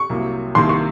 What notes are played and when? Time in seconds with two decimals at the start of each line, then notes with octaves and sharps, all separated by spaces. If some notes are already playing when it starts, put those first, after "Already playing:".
Already playing: C#6
0.10 C2 C3 F#3 A#3
0.55 C2 C3 D#3 A#3 C6
0.69 C#6